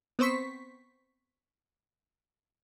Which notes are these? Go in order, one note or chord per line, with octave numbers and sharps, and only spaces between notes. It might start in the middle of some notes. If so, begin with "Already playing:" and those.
B3 C4 C5 C#6 B6